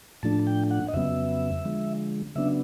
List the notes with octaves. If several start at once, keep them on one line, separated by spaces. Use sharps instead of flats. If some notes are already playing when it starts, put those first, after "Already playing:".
A2 F3 A3 D4 A5
G5
F#5
D#5
F2 C#3 F#3 B3 E5
D3 F3 G#3
C#3 F#3 B3 D4 E5